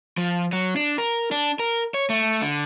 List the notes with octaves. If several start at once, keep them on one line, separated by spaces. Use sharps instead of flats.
F3
F#3
D4
A#4
D4
A#4
C#5
A3
D3